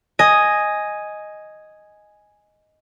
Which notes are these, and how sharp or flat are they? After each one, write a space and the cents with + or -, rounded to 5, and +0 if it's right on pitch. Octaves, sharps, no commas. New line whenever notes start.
D#5 +0 G#5 +0